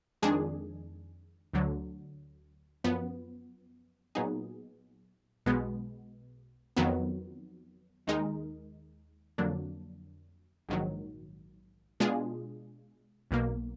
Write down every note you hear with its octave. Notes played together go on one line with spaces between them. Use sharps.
F2 D#3 G#3 D4 G#4
D2 D3 F#3
F#2 F3 B3
A#2 F#3 B3 D#4 G#4
B1 B2 G#3 B3
F2 D#3 F#3 B3
D#2 D#3 G#3 D#4 A#4
F2 D3 F#3 A#3 D4
A#1 G#2 D#3 F#3
B2 G#3 D4 F4 G#4
B1 B2 A#3